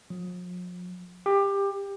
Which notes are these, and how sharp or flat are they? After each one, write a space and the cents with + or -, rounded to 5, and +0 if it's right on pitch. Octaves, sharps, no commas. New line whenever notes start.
F3 +45
G4 +20